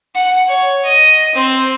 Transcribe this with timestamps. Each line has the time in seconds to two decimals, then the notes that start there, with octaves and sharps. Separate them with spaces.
0.14 F#5
0.48 C#5
0.85 D#5
1.35 C4